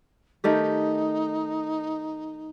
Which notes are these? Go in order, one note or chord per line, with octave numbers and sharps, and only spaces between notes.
D#3 A3 D#4 G4